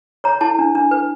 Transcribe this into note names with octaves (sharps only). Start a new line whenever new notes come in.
C#5 A#5
E4 A5
D4
D4
B4